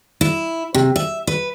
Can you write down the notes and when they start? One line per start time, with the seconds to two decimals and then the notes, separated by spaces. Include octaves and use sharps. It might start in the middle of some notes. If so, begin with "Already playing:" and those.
0.21 E4
0.74 C3
0.96 E5
1.27 B4